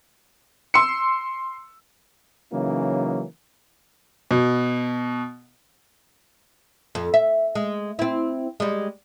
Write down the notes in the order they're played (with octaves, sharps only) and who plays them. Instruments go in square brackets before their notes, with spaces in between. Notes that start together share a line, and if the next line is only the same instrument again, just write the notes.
[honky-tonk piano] C6 E6 C#7
[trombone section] C#3 E3 F#3 A#3 C#4 D#4
[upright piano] B2
[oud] F2
E5
G#3
C4 E4
G3 G#3